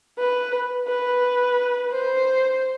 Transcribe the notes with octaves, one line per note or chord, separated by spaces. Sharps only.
B4
B4
C5